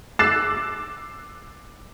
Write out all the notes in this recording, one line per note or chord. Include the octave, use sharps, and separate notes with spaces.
D6 E6 F#6 A6 C7 E7